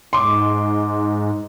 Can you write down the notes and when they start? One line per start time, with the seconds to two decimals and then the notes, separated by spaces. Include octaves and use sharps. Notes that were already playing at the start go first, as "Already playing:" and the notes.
0.13 G#2 C6 D6